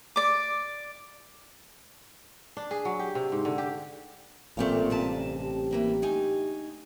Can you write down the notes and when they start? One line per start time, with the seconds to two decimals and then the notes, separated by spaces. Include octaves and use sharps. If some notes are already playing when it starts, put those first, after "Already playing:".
0.16 D5 D6
2.57 D4
2.71 G#4
2.85 F#3
2.99 G4
3.15 C3
3.32 G#2
3.45 D3
3.58 G4
4.57 A1 A#2 A3 C4 G4 F5
4.90 G2 C3 A5
5.36 G4
5.71 E3 A#3 B3
6.02 D2 D#4 G#5